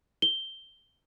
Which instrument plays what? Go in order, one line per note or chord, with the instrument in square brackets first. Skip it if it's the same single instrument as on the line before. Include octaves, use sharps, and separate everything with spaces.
[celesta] G7